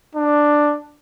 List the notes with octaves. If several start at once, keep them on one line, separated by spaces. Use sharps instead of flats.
D4